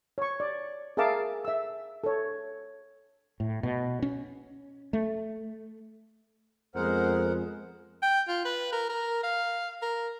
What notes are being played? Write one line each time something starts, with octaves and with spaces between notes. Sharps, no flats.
C#5 C#6
D5
G#4 A#4 E5 F5 A5 D6
E5 E6
A4 C#5
A2
B2
C#4
A3
F2 G#3 B3 A#4 C5 F#5
G5
F4
B4
A#4
A#4
F5
A#4